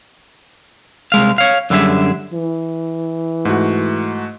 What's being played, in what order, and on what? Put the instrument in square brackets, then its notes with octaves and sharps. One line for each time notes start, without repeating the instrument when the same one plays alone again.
[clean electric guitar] C2 G#3 F5
C#5 F5
F#2 D3 G3 G#4 E5
[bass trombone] E3
[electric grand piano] G#2 A3 F#4